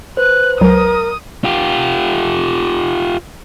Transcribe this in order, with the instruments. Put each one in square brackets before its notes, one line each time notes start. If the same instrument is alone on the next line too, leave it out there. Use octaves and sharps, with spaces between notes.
[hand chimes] B4 C5 [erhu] F#6
[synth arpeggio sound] C#2 F#3 [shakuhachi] A#4 [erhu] D#6
[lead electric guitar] F4 G4